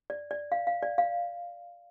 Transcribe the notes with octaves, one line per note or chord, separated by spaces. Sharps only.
D5
D5
F5
F5
D5
F5